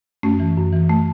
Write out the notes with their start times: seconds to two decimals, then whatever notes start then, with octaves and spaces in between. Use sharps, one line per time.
0.23 F#2 A3 C#4
0.40 E3
0.57 F#2
0.73 E3
0.90 A3